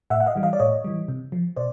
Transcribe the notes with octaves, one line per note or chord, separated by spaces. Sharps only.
A2 E5 F#5
F#5
D#5 F5
E3 G3
D#5 F5
D5
A2 C#5 D#5
E3 G3
C3
F3
B2 C5 D5